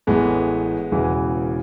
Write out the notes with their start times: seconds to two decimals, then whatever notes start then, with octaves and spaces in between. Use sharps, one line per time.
0.07 A1 A2 E3 G#3 B3
0.91 E1 E2 C#3 E3